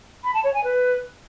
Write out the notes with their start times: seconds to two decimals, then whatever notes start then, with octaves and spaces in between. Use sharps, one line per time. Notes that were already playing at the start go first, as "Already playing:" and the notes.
0.24 B5
0.34 A5
0.44 C#5
0.54 G#5
0.64 B4